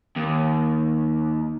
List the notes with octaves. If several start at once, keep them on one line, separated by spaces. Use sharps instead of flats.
D#2